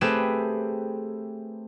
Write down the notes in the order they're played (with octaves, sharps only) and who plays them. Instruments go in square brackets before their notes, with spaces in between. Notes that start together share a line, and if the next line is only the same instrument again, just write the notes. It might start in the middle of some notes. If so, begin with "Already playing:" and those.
[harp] A3 C4 G4 G#4 B4 E7